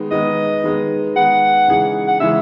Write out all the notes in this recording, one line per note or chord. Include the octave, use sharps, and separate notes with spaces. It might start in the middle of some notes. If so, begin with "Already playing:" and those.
Already playing: D#3 G#3 B3 D#4
D#3 G#3 B3 D#4 D#5
D#3 G#3 B3 D#4
D#3 G#3 B3 D#4 F#5
C#3 E3 G#3 D#4 G#4
F#5
C#3 E3 G#3 D#4 G#4 E5